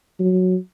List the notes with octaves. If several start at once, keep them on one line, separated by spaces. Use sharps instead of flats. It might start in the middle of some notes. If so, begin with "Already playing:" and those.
F#3